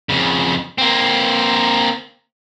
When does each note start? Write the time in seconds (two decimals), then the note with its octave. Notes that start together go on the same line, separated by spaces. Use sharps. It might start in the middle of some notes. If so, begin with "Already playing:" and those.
0.09 F2 C#3
0.78 A#3 C4